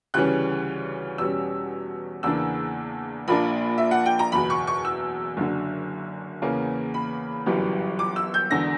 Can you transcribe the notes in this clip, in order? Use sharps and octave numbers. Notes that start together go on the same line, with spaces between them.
D2 C#3 E3 G3 C#4 F#6
E2 B2 G3 C#4 E6
E2 C#3 E3 A#3 D4 E6
A#1 A#2 A#3 D4 B5
E5
F#5
G5
A#5
F#1 E2 B2 B5
C#6
C#6
E6
F#1 F#2 D3
E2 C#3 E3 A#3 C#4
B5
G1 F#2 E3 G3
D6
E6
G6
E1 E2 D3 A#6